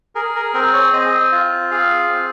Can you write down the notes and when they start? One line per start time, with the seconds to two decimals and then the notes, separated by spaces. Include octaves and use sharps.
0.15 G#4 A#4
0.35 A#4
0.54 C4 A#4
0.73 C#5
0.93 C4 D#5
1.32 F4
1.71 G#4 F5
2.09 C4